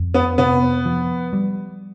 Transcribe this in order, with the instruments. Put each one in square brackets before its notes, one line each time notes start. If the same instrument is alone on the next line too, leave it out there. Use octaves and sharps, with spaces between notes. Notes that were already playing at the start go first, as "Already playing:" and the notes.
Already playing: [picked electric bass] F2
[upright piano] B3
[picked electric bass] C3 [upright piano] B3
[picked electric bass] F3
G3